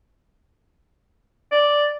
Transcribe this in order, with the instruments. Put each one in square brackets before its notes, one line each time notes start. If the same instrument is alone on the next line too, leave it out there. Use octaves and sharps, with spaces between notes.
[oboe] D5